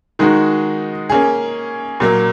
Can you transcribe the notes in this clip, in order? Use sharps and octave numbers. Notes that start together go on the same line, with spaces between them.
D#3 G#3 D#4 F#4
A#3 C#4 G#4
A#2 F#3 A#3